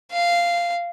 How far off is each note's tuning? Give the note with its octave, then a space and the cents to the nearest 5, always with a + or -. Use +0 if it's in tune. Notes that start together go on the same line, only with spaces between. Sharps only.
F5 -10